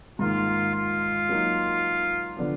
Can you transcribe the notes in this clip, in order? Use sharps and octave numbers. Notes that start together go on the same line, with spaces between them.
G#2 D#3 A#3 D#4 F4
F4
F#3 A#3 D#4
D3 F3 B3 D4